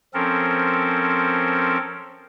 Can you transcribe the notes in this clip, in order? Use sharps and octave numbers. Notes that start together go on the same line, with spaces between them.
F3 C4 C#4 A4 A#4